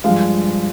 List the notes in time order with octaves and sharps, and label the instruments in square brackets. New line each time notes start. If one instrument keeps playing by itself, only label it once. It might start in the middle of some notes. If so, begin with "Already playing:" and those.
[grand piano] G2 F3 G#3 F5